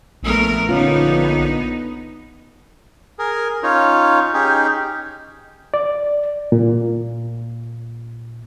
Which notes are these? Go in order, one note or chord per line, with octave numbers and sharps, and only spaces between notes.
A#1 A3 B3 A#4
D3 B3 C#4 D#4 F4
G#4 A#4
C#4 D#4 F4 C#5
C#4 D#4 G4 G#4
D5
A#2